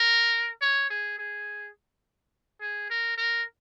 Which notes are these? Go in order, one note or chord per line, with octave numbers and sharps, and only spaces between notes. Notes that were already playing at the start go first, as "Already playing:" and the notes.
Already playing: A#4
C#5
G#4
G#4
G#4
A#4
A#4